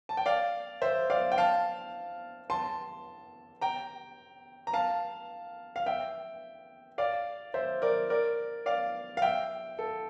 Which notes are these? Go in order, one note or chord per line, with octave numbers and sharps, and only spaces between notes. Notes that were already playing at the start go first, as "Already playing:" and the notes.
A5
G5
D5 F5
C5 E5
D5 F5
G5
F5 A5
A5 C6
G5 A#5
A#5
F5 A5
F5
E5 G5
D5 F5
C5 E5
A#4 D5
A#4 D5
D5 F5
F5
E5 G5
A4